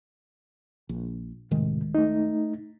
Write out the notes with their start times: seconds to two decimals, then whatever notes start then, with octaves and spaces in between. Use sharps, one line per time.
0.89 A#1
1.51 D2 A2 C3 D#3 G#3
1.95 A3 D#4